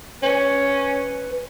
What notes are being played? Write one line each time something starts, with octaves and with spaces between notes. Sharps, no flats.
C#4 B4